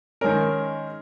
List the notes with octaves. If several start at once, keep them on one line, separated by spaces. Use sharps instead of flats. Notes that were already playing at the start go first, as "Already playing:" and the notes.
D#3 G#3 C#4 A#4